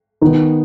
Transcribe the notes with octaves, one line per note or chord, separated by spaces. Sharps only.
D#3 B3 D#4